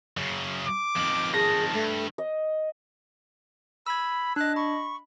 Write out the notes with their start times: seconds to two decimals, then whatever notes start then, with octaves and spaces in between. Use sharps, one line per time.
0.17 F#2 C#3
0.65 D6
0.96 F2 D#3
1.34 G#4 A5 A#6
1.73 G2 A3
2.18 D#5
3.87 B5 E6 G#6
4.36 D4 D#5 F#6
4.56 B5 C#6